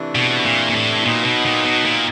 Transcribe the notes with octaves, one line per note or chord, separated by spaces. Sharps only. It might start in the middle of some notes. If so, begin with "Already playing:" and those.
Already playing: C3 E3 A3 D4
B2
A#2
A#2
A2
A#2 F#3 B3 D#4
B2
A#2
B2
A#2